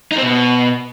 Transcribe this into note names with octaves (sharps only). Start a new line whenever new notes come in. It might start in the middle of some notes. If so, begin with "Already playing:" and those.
D#4
C4
B2